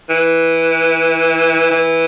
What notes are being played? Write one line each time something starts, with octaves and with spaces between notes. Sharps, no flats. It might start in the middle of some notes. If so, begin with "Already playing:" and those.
E3
E3